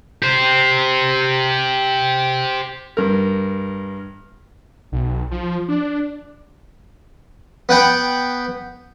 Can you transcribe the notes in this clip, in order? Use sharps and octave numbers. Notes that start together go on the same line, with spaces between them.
G4 C5
G2 A#4
B1
F3
D4
B3 F#5 G5 B5